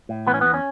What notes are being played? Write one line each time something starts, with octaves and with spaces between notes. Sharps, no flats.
A2
E3 B3
C#4
E2 B3
C#4